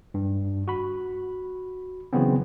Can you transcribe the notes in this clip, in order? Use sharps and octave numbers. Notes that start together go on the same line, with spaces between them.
G2
F#4 B5
C#3 E3 F#3 B3 C4